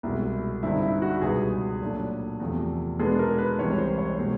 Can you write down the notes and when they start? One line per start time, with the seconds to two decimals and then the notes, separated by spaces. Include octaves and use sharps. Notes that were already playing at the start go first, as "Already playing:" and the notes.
0.03 C2 B2 G#3 E4
0.63 G2 D3 G3 C4 D#4 E4
0.82 E4
1.02 F#4
1.22 C#2 B2 G3 B3 G#4
1.81 A#2 F#3 A3 D4
2.40 E2 C3 F3 A3
2.99 B2 G#3 B3 D4 A4
3.19 A#4
3.38 B4
3.58 C2 C3 E3 G#3 C#4 C#5
3.78 C5
3.98 C#5
4.18 B2 G#3 C#4